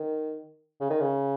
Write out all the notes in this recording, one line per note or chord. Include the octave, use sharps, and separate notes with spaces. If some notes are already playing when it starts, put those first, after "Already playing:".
Already playing: D#3
C#3
D#3
C#3